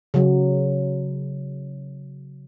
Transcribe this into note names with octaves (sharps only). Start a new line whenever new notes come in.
C#3 F#3